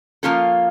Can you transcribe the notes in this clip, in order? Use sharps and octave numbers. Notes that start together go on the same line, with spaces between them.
F3 A#3 C#4 F4 A4